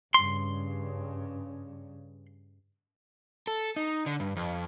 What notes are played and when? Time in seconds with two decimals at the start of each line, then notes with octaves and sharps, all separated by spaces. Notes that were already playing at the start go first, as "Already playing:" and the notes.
0.14 G2 C#3 C6
3.47 A4
3.76 D#4
4.06 D3
4.20 G2
4.36 F2